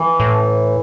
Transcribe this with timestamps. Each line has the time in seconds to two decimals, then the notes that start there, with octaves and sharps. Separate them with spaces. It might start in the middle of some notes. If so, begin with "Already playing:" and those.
Already playing: E3
0.20 A2